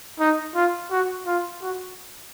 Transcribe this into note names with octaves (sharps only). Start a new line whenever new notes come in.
D#4
F4
F#4
F4
F#4